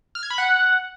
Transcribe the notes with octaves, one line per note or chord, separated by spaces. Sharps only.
F6
G#6
B5
F#5